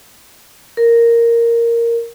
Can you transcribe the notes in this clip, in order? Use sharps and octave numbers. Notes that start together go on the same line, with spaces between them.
A#4